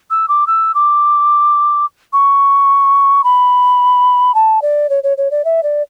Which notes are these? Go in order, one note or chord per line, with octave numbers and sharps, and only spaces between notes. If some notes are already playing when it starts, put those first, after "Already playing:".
E6
D6
E6
D6
C#6
B5
A5
D5
C#5
C#5
C#5
D5
E5
D5